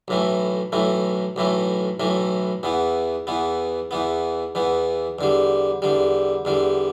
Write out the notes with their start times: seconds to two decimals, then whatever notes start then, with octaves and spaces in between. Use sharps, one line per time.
0.08 B1 A2 E3 A3
0.72 B1 A2 E3 A3
1.36 B1 A2 E3 A3
2.00 B1 A2 E3 A3
2.63 E2 E3 B3
3.27 E2 E3 B3
3.91 E2 E3 B3
4.55 E2 E3 B3
5.19 E2 D3 G3
5.82 E2 D3 G3
6.45 E2 D3 G3